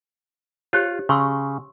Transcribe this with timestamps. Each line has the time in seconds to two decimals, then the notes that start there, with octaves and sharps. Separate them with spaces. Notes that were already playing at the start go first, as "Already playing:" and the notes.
0.73 F4 G4 C5 C#5
1.09 C#3 C6 C#6 E6